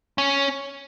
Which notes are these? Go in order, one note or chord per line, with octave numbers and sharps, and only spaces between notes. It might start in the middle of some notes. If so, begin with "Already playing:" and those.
C#4